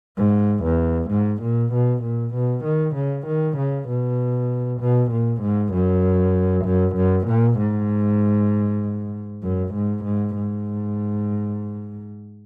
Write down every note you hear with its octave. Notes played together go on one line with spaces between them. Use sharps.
G#2
E2
G#2
A#2
B2
A#2
B2
D#3
C#3
D#3
C#3
B2
B2
A#2
G#2
F#2
F#2
F#2
A#2
G#2
F#2
G#2
G#2
G#2